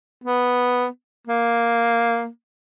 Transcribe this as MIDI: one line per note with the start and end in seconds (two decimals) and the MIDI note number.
0.24 0.87 59
1.27 2.28 58